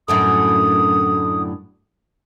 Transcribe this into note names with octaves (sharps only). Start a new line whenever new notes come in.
F#2 A2 D3 D#6